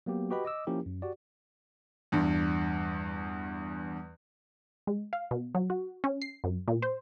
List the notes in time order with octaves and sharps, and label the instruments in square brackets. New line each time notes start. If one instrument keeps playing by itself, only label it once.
[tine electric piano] F#3 A#3 B3 G4
F#4 G4 B4 D#5 B5
D#5 D6 E6
F3 A#3 C#4 E4 G4 A#4
F#2
F#4 G4 D5
[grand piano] E2 G2
[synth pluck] G#3
F5
B2
F#3
F#4
C#4
C7
F#2
A#2
C5